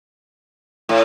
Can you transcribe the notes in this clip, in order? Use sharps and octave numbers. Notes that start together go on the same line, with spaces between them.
A2